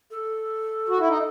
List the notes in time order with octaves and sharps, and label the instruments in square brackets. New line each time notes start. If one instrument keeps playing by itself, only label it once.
[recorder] A4
[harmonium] F#4
E4
D#4